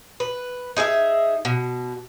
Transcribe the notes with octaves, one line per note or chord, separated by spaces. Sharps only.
B4
D#4 G#4 A#4 E5
B2